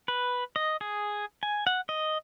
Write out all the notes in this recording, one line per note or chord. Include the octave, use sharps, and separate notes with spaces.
B4
D#5
G#4
G#5
F#5
D#5